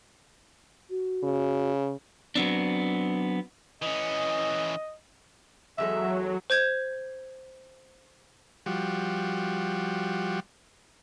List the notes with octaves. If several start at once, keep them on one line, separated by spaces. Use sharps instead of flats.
F#4
C#3
F#3 B3 C4 D4
E3 C#4 D#5
E2 F#3 G#3 A4 E5
C5 G6 G#6
F3 G3 F#4